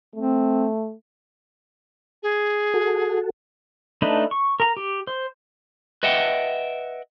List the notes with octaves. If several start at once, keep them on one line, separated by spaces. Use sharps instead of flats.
A3 C4
G#4
F#4 A4
A3 D4 D#4 B4
C#6
A#4 A#5
G4
C5
B4 D#5 E5 F#5 G5